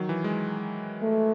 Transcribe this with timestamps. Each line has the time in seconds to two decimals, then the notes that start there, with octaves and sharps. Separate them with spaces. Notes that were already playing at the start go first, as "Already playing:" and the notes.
Already playing: D#3 F#3
0.09 E3
0.24 G#3
1.02 A3